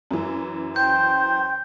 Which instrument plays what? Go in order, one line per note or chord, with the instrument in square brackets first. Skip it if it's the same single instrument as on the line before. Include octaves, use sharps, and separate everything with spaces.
[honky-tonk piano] F#2 E3
[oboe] C5 [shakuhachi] G5 [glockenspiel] G6